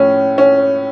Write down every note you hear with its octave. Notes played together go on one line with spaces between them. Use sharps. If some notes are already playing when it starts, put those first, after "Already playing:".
Already playing: A2 F3 A3 C#4
C#4